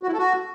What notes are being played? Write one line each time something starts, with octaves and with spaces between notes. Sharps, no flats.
F#4
E4
A4
F#4